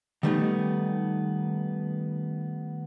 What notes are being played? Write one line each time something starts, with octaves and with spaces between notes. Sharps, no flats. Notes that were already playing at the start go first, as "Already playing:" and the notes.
D#3 G3 A3 B3 D#4